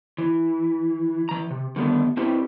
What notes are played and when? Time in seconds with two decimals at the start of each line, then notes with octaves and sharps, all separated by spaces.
0.18 E3
1.29 E3 A#5
1.51 C3
1.76 D3 D#3 G3 A3 B3 D4
2.17 C4 D4 E4 G4 B4 C5